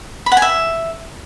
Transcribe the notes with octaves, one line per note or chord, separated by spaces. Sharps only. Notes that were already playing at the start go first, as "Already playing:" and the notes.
B5
F#5
G#5
E5